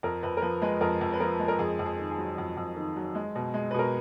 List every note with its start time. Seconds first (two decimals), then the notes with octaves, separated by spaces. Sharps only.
0.03 F2 A#4
0.23 F2 B4
0.37 A#4
0.42 F3 B4
0.62 G#3 B4
0.81 F2 A#4
1.01 F2
1.14 B4
1.20 F3 A#4
1.40 G#3
1.48 A#4
1.59 F2 G#4
1.79 F2
1.86 G#4
1.99 D#3
2.11 G#4
2.18 F#3
2.38 F2
2.57 F2
2.76 D#3
2.96 F#3
3.15 G#3
3.36 B2
3.54 G#3
3.71 B4
3.74 B2 A#4